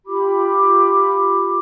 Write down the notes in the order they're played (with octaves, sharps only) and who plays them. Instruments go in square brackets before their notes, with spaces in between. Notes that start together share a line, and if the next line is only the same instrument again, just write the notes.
[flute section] F4 G4 B5 D6